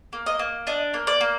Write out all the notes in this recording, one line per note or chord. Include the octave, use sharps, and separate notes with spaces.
A#3
D#5
A#3
D4 D#5
A#3
D5
A#3